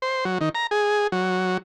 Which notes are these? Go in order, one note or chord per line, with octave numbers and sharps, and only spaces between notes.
C5
F#3
D#3
A#5
G#4
F#3